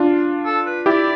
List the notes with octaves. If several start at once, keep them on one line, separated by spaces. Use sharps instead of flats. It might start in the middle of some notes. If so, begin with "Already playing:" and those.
Already playing: D4 F4
A4
B4
E4 G4 D5